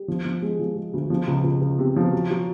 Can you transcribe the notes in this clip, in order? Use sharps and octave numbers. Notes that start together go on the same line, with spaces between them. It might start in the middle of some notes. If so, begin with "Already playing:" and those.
Already playing: G3
F3
F3
G#3
F3
G#3
D2
F3
C#2
C#2
C#2
C3
F3
F#3
F#3